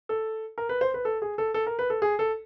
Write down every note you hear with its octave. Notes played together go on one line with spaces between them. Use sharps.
A4
A#4
B4
C5
B4
A4
G#4
A4
A4
A#4
B4
A4
G#4
A4